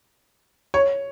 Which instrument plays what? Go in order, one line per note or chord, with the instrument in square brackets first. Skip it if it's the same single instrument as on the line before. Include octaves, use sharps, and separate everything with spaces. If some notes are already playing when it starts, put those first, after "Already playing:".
[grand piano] C#5